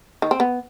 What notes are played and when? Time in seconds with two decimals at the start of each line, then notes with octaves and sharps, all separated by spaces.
0.22 D#3
0.31 C4
0.40 B3